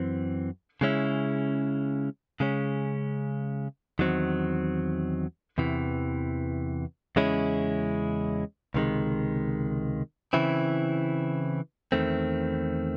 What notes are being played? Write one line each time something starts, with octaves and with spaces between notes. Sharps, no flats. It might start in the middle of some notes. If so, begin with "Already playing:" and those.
Already playing: F#2 E3 C4
C#3 G#3 C#4 E4
C#3 G#3 C#4
E2 D#3 F#3 C4
E2 C3 E3
E2 C#3 G#3 C#4 E4
C#2 C3 D#3 G#3
C#3 E3 C4 E4
E2 D#3 A3 C4